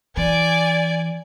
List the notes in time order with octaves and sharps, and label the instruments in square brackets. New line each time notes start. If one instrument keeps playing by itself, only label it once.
[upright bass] E3 [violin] D5 G#5